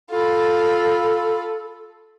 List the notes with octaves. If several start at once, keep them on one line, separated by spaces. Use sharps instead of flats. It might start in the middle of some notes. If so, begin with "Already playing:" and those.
F4 A4 B5